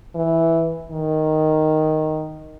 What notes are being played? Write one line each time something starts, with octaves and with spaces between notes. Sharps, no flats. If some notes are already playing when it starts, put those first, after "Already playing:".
E3
D#3